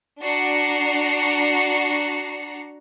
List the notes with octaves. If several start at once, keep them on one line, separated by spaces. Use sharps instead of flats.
D4 F#4 A#5 C7 C#7